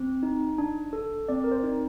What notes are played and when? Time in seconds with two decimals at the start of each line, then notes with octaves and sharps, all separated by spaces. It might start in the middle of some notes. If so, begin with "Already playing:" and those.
Already playing: C4
0.23 D#4
0.58 D4
0.93 A4
1.28 C4 D5
1.44 A#4
1.52 C5
1.63 D#4